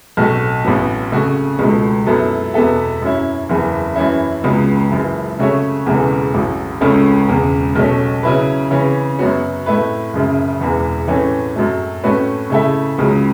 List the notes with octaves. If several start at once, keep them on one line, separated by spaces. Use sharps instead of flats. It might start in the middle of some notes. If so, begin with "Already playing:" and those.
B1 A2 A3 F#4
A1 A2 F#3 B3
C#3 A3 F#4
C#2 B2 A3
F#2 F#3 B3 E4 A4
E2 B2 B3 A4 E5
F#2 F#3 C#4 E4
F#1 E2 E3
F#2 E3 C#4 E4
C#2 C#3 F#3 B3
F#1 F#2 E3
C#3 A3 F#4 C#5 E5
E1 E2 C#3 E3 A3
A1 A2 F#3
C#2 C#3 A3 C#4 A4
E1 E2 C#3
B1 B2 A3 C#4
C#3 F#3 C#4 E4 B4
C#3 E3 C#4
F#2 F#3 B3 F#4 C#5
A2 A3 E4 B4
F#1 F#2 C#3
E1 E2 E3
A2 E3 A3 C#4
F#2 F#3 A3
A2 A3 C#4 F#4 B4
C#3 A3 E4 A4 E5
C#2 C#3 F#3